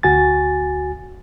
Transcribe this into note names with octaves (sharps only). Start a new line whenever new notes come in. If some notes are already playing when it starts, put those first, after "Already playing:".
D2 F#4 G#5 A6